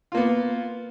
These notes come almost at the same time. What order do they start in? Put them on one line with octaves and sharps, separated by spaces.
F4 A#3 B3